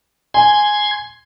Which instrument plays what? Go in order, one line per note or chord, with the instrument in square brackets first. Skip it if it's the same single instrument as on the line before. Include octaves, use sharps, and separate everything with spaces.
[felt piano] G#5 [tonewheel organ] C6 G#6